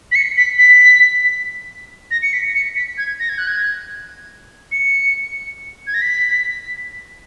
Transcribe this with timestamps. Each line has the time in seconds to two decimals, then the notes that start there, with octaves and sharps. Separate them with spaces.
0.12 B6
0.15 C#7
0.37 B6
0.58 B6
2.11 A#6
2.22 C#7
2.33 B6
2.55 C#7
2.76 B6
2.98 G#6
3.20 A#6
3.29 G#6
3.38 F#6
3.47 G#6
4.72 C#7
5.87 G#6
5.94 A#6
6.01 B6